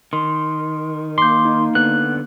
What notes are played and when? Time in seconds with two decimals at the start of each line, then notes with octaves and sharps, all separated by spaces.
0.13 D#3 C6
1.18 A#3 C6 D6 G6
1.45 D#4
1.75 D3 B3 F#6